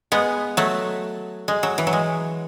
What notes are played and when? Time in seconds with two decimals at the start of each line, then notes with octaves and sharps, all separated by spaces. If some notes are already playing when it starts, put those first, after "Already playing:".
0.12 G#3 B3
0.57 F#3 A3
1.48 G#3
1.63 F#3
1.78 E3
1.87 F#3
1.93 G#3